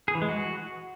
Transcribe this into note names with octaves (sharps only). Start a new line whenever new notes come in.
G#4
E3
G#3
F#4